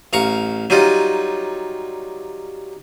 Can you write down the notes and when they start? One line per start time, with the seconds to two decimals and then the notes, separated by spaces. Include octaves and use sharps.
0.13 A1 F5 A#5 C#6
0.70 F#3 G3 D#4 F4